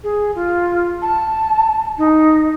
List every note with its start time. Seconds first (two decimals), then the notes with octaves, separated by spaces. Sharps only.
0.04 G#4
0.35 F4
1.02 A5
1.98 D#4